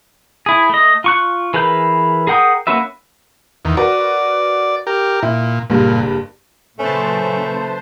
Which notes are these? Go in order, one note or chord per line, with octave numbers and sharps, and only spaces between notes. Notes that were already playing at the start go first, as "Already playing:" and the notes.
E4 G#4
A3 D#5
F4 C#6 F#6
E3 G#4 A#4 B4 G6
G#4 A#4 F#5 G5 D#6
A#3 C#4 F#4 B4 E5
E2 D#3
F#4 A#4 B4 D5
G4 A#4
A#2 E4
F#1 G2 A#2
A#2 C#3 F#3 A3 C#4 B4 C5 A5